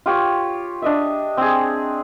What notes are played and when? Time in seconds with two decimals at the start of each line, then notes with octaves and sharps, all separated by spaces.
0.06 F4 G4 C#5
0.82 D4 D#5 E5
1.37 C4 G#4